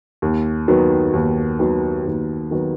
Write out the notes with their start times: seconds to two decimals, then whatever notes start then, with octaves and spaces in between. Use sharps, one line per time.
0.22 D#2
0.68 D#3 F#3 B3
1.13 D#2
1.59 D#3 F#3 B3
2.06 D#2
2.51 D#3 F#3 B3